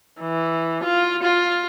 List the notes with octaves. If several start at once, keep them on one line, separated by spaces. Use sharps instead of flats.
E3
F4
F4